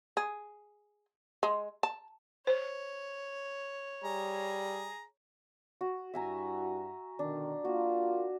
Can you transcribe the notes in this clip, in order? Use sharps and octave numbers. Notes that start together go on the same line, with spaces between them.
G#4
G#3
A5
C5 C#5
G3 G#4 A#5
F#4
G2 E4 F#4 E5 G#5 A#5
B2 D3 D#3 D4
A#3 F4 F#4